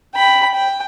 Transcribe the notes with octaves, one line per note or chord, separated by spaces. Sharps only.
G5 B5
G5